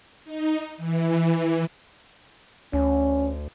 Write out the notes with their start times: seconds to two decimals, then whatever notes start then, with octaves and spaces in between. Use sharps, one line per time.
0.24 D#4
0.77 E3
2.73 D2 C#4